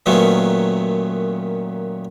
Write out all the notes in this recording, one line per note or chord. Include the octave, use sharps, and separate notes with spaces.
F#2 A#2 D#3 F#3 A3 B3